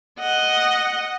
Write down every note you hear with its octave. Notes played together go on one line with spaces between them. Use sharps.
D#5 F#5